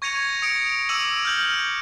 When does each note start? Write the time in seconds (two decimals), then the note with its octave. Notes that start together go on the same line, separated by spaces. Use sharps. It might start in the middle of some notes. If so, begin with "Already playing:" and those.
0.02 C#6 G#6 A#6 C#7 D#7 F7
0.42 D#6 C#7 D7
0.89 D6 E6 D7 D#7 F7 F#7
1.25 F6 G6 F#7